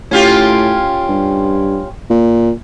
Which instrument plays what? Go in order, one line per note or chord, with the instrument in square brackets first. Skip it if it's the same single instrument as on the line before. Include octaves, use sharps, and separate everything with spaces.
[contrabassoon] A2 [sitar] C#4 F4 G4
[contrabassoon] G2
A#2